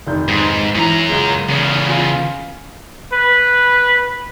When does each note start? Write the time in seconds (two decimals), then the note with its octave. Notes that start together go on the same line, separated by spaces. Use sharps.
0.07 F1 D#3 G6
0.28 G#2
0.75 F#2 E3 A#5
1.09 C#2 G#3
1.49 E2 C#3
1.89 F4 G#5
3.13 B4